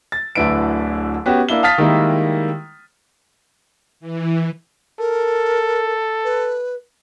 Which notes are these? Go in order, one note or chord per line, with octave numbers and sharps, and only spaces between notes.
A6
D1 D2 D3 E4 B4 D7
B3 C#4 F#4 G4
A#3 D4 E4 G7
F5 A5 D#6 F6 A6 B6
D#3 G3 G#3 A#3 E4
E3
A4 A#4
B4